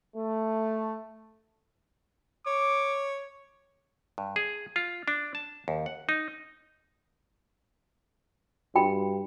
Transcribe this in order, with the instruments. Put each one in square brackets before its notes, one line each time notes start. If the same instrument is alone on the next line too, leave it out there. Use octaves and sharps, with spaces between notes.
[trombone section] A3
[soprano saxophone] C#5 [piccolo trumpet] D6
[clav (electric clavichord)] G2
G#4
F4
D4
A5
D#2
F#5
D#4
[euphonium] G2 [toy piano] F#4 G5 B5